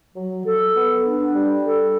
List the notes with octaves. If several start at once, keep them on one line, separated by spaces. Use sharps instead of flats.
F#3
A4
B3
D4
G3
A4